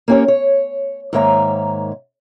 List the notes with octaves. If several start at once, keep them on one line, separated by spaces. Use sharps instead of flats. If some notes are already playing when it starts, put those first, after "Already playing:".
A#3 C4 C#4 G4 C#5
C#5
G#2 D#3 A#3 C#5 E5 A#5